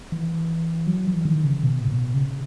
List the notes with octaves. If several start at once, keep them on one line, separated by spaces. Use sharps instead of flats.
E3
F#3
E3
D#3
C#3
B2
A#2
B2
C#3